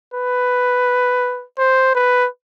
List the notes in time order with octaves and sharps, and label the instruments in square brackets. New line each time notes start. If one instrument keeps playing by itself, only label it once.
[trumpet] B4
C5
B4